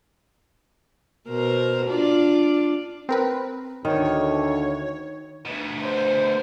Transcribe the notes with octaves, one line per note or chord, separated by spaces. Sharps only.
B2 A#4 C5
D4 F4 D5
C4 A#4 B4
D2 D#3 C#5
D2 B2
C5